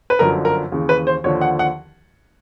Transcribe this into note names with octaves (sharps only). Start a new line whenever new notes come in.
B4
G1 F#2 D3 F3 A#4
A#4
D#2 C#3 E3
B4
C5
D#2 D3 F3 C#5
F#5
F#5